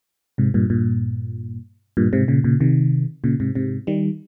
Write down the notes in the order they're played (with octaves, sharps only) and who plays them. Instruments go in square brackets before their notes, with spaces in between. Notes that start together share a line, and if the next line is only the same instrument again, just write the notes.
[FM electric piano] G#2 C3
G2 A#2
G2 A#2
G2 A#2
G#2 C3
A#2 C#3
A#2 C#3
C3 D#3
A#2 C#3
G#2 C3
G#2 C3
D#3 G3